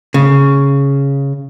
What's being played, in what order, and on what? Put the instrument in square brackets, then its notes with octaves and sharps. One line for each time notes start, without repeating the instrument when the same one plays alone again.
[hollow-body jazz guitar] C#3